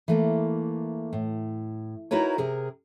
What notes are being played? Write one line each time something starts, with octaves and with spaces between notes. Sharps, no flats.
E3 A3 A#3
A2
D#4 E4 F#4 A#4 B4 C#5
C3 G#4 A#4